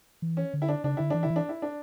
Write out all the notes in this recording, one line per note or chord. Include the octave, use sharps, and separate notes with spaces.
E3
C#4
D3
E4
D4
C#3 D4
D3 E4
E3 D4
D3 E4
E3
D4
E4
D4